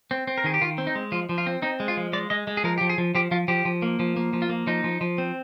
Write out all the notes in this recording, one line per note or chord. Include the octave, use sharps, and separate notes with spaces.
C4
C4
A#4
D#3 G#4
G4
D#3 F4
C4
D#4
G#3
F3 F4
F3
F4
C4
C4 D#4
G#3
F4
F3
G#3 D5
G#3 D#5
G#3
G#4
F3 A#4
F3 G4
G#4
F3
F3 G4
F3 F4
F3 G4
F3
A#3
F3
A#3
F3
F4
A#3
F3 D#4
F3
F3
C4